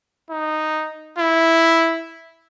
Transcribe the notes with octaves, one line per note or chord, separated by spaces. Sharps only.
D#4
E4